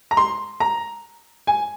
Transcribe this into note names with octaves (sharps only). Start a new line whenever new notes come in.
A#5
C6
A#5
G#5